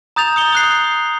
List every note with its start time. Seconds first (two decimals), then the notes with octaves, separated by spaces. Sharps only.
0.16 A#5 D#6 G6 A6 F7
0.36 D#6 C#7 G7
0.53 D#6 F#6 C7